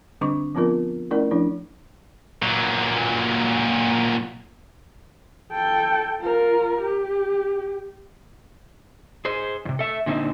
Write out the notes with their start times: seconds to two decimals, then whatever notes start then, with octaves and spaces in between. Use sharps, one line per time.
0.21 D3 G3 C4 D4 C#6 D6
0.55 F3 B3 C4 F4 A#4
1.11 A3 C#4 E4 A#4 D5
1.31 F3 D4 E4
2.42 A#2 F#3
5.52 A4 G5
6.20 F4 A#4
6.81 G4
9.25 G#4 C5
9.65 E2 C3
9.79 A4 E5
10.06 A#2 D3 F#3 A#3 C4 D#4